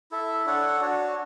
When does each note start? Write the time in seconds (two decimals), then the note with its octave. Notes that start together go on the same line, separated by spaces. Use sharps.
0.11 E4 A4 E5
0.46 D4 A4 C#5 F#5
0.80 D4 F#4 C#5